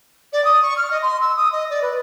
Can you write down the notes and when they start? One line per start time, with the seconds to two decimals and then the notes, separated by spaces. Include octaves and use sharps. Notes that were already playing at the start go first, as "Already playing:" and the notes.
0.32 D5
0.44 D#6
0.62 C#6
0.76 F6
0.90 D#5
1.02 C6
1.20 E6
1.36 D#6
1.52 D#5
1.69 D5
1.82 B4